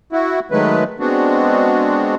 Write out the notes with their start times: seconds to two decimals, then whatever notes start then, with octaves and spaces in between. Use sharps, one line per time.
0.12 E4 F#4
0.51 D#3 F#3 G#3 A3 B4
1.00 G#3 B3 C4 D4 F#4